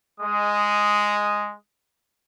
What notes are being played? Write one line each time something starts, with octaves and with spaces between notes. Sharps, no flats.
G#3 D#6